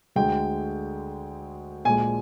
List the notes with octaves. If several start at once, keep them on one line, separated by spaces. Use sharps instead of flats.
D2 D3 G#3 G5
A#1 A#2 G#3 G#5